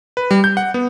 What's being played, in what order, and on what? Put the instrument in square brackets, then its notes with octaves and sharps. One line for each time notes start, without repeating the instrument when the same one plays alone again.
[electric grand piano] B4
G3
G6
F#5
B3